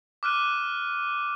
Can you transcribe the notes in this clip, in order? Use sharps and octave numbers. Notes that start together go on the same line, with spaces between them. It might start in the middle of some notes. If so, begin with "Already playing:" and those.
D6 F6 F#6 D#7